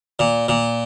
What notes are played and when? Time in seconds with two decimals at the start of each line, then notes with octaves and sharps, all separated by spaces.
0.19 A#2
0.48 A#2